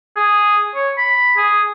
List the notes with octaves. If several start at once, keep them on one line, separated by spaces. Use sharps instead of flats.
G#4
C#5
B5
G#4